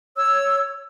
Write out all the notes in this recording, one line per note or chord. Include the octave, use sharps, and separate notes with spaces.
C#5 E6